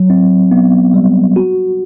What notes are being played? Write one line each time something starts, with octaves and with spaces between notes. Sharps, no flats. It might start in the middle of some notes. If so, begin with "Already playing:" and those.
Already playing: F#3
C4
B3
G3
F#4